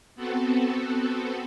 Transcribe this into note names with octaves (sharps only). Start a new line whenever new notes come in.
B3 C4 F#4 A4